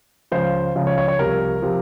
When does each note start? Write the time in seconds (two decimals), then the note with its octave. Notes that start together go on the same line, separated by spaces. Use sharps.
0.32 C#2 C#3 F3 C5
0.76 C#2 C#3 F3
0.87 C#5
0.98 C#5
1.08 C#5
1.19 C2 C3 F3 A#4
1.62 C3 F3